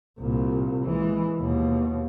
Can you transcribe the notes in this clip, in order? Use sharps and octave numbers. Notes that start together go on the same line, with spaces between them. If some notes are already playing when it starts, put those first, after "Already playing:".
C2 A#2
E3 G#3
D#2 B2